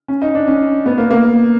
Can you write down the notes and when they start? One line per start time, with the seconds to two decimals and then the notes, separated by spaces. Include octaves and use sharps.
0.08 C#4
0.22 D#4
0.35 D4
0.48 C#4
0.86 B3
0.98 A#3
1.11 A#3